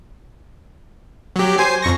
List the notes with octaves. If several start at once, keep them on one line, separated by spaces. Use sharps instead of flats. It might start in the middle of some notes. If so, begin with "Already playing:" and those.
F#3 G4
C5 G#5 C7
F2 C#6 A#6